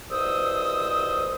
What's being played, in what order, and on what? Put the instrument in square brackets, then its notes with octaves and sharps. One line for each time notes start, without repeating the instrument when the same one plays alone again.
[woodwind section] C2 B2 C5 D#6 E6